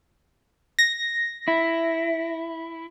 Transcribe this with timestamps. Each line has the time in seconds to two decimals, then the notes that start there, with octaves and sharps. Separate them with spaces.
0.79 A#6
1.48 E4